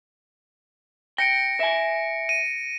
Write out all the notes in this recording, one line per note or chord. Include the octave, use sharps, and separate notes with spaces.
G5 A#6 C#7 D7
E5 G#5
D#7